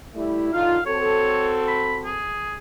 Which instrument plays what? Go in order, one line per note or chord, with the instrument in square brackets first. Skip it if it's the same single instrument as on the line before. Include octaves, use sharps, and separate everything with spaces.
[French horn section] G3 A3 E4
[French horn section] D3 D#4 F4 [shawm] F5
[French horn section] C4 F#4 A4 [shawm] C#5
[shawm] B5
G#4